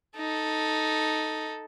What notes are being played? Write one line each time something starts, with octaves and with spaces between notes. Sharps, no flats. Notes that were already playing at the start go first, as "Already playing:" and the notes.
D#4 A4